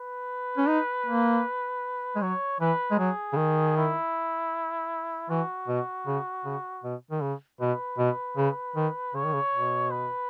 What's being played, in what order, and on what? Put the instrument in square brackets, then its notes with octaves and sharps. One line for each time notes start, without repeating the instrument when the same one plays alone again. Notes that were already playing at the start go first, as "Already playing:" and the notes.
Already playing: [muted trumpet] B4
[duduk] C#4
D#4
A#3
G#3
[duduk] F#3 [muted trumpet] C#5
[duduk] E3 [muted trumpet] B4
[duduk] G#3
[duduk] F#3 [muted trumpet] G#4
[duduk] C#3
D#3
[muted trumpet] E4
[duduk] E3 [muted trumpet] F#4
[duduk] B2
C#3
C#3
B2
D#3
C#3
[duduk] B2 [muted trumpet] B4
[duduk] B2
C#3
D#3
[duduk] C#3 [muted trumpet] C#5
[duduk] D#3
C#3
B2
[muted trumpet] B4